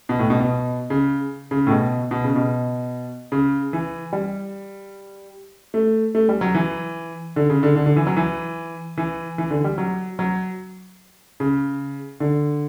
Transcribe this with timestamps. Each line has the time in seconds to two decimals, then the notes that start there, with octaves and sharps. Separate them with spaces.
0.09 B2
0.19 A2
0.30 B2
0.40 B2
0.90 C#3
1.51 C#3
1.67 A2
1.70 B2
2.11 B2
2.24 C#3
2.36 B2
3.32 C#3
3.73 E3
4.13 G3
5.74 A3
6.15 A3
6.29 G3
6.41 F#3
6.55 E3
7.36 D3
7.50 C#3
7.63 D3
7.76 D3
7.86 D3
7.96 E3
8.07 F#3
8.17 E3
8.97 E3
9.38 E3
9.50 D3
9.64 G3
9.78 F#3
10.19 F#3
11.40 C#3
12.20 D3